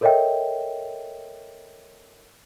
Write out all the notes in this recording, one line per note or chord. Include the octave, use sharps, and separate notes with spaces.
A4 A#4 C#5 D#5 E5 G5